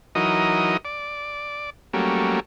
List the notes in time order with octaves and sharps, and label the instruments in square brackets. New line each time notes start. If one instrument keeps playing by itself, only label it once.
[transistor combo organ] E3 F#3 D#4 A#4 D#5
D5
F#3 G3 A3 A#3 C#4